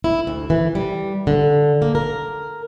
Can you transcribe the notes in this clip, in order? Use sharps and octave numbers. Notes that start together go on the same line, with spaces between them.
E4
D2
E3
G3
D3
A#3
A#4